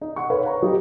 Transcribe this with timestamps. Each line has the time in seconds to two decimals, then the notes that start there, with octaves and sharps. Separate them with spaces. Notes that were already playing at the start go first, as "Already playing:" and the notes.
0.01 D#4
0.16 F#5 C#6
0.30 A4 B4 C#5 F5
0.46 A#5
0.62 F#3 D#4 G4 D#5